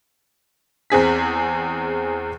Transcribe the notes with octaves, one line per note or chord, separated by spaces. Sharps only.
E2 C4 G#4 B6